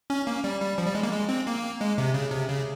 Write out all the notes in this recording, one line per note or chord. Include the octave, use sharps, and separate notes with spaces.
C#4
A#3
G3
G3
F3
G3
G#3
A#3
G#3
C4
A#3
G#3
C3
C#3
C3
C#3